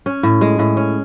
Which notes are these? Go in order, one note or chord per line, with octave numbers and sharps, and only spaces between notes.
C#4
A2
G#3
A2
C#4